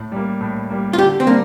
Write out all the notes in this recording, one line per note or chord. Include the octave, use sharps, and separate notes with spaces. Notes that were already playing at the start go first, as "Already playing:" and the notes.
Already playing: A2
G3 A#3
A2
G3 A#3
F4
D3 G4
C4
G3 A#3 D4